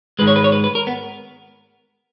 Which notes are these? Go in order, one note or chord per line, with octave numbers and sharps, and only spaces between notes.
G#2 D#3 G#3 B4
C#5
B4
C#5
B4
B4
A#4
B3